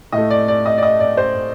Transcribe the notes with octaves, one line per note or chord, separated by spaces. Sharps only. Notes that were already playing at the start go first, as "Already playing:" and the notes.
A2 A3 D#5
D5
D5
D#5
D5
D#5
D5
C5